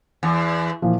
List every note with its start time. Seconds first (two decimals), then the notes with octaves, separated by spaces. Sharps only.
0.23 E2
0.82 A#2 E3 F3